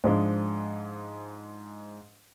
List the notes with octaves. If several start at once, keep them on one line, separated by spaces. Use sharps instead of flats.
G#2 F3 G#3 D4